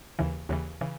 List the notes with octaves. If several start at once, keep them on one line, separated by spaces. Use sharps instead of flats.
D#2 C#3 E3
D#2 C#3 E3
C#3 E3